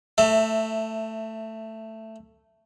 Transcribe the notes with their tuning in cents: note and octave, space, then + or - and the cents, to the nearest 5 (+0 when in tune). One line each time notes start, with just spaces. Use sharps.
A3 +10 E5 +0 A5 +40